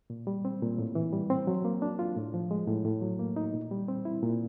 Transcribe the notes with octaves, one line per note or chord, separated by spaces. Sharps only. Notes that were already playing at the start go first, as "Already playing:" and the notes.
A#2
G3
C4
A#2
A2
E3
G3
C4
F#3
A#3
D4
F4
A2
F3
G#3
A2
A2
F#3
A#3
D#4
A#2
G3
C4
E4
A#2